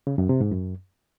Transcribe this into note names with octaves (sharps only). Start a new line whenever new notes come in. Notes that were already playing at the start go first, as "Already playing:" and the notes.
C#3
F#2
C3
G#2
F#2